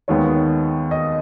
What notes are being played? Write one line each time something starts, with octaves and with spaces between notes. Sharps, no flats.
D#2 D#3 G#3 B3 C#5
D#5